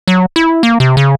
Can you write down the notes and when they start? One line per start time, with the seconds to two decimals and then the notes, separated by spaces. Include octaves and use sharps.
0.08 F#3
0.36 E4
0.63 A#3
0.80 C3
0.97 C#3